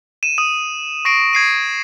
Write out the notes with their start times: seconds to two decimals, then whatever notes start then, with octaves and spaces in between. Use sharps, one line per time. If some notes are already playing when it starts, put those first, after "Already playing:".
0.23 D#7 E7
0.38 D#6 D#7
1.05 C#6 A#6 C7 D7 D#7
1.33 G#6 C7 D#7